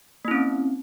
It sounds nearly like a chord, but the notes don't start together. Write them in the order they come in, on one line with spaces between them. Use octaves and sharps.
A#3 E4 C#4 C4